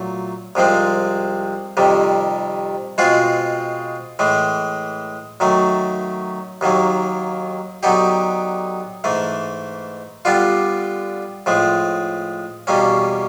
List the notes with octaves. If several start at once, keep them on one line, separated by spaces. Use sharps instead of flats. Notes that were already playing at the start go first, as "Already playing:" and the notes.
Already playing: A#2 F#3 A3
C2 C3 F3 G#3 C4
F2 C3 D#3 G3
B2 G#3 C4 F4 G#4
A2 E3 G#3
F#2 D#3 F#3 A3
D#2 D#3 F#3 A#3
D3 F#3 B3 D#4 G4
G#2 E3 A3
D3 G3 B3 D4 F4
A2 F3 G#3
E2 B2 G3 A#3 C#4